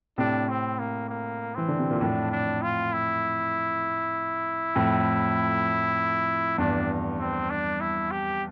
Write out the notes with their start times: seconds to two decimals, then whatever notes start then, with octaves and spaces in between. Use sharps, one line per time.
0.18 A2 C3 D4
0.49 C4
0.79 A#3
1.09 A#3
1.55 E3 C4
1.68 D3
1.79 C3
1.90 A#2
2.01 F2 A2 D4
2.32 D4
2.62 F4
2.93 E4
4.75 F2 A2
6.58 E2 G2 D4
7.19 C4
7.50 D4
7.81 E4
8.11 G4